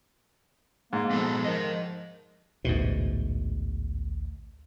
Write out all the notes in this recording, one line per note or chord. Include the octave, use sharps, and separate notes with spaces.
G#2 A#3
F3 B3 D#4 A4
F3 A#4 D#5
A1 D2 G#2 B2